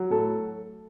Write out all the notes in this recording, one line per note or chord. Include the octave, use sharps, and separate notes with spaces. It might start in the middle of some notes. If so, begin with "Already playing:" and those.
Already playing: F#3
A2 A4